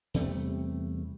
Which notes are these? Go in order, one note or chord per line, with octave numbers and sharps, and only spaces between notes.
E2 C3 G3 A3